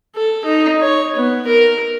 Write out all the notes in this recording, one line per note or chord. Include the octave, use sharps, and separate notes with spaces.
A4
D#4
C#5
B3
A#4